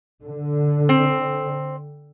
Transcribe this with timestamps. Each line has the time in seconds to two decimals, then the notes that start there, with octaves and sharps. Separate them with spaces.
0.25 D3
0.89 C4